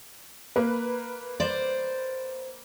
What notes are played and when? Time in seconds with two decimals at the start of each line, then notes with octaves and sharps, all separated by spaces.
0.56 A#3 B4
1.40 C5 D5